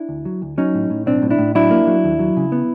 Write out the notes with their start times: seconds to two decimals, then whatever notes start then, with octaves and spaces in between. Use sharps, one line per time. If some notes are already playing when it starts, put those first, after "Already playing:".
Already playing: D4 E4
0.09 D2
0.25 F#3
0.42 D2
0.58 F#3 C#4 D#4
0.74 A2
0.90 A2
1.06 B1 C4 D4
1.22 A2
1.30 D4 E4
1.38 A2
1.55 F#3 D4 E4
1.71 A#3
1.87 F#3
2.04 D#2
2.19 F#3
2.37 C#3
2.52 B3